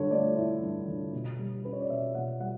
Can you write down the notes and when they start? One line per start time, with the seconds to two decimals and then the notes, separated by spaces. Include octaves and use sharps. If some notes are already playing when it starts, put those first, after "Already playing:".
Already playing: G2 D3 C#5
0.11 A3 D5
0.37 E4
0.62 G2
0.88 D3
1.13 B2
1.39 G3
1.64 C#4 B4
1.73 C#5
1.81 D5
1.89 B2 E5
2.15 B2 F#5
2.40 G3 F#5